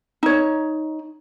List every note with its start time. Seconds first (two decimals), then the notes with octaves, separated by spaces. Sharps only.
0.23 D#4 C#5